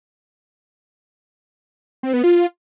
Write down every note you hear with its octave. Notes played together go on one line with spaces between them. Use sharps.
C4
B3
F4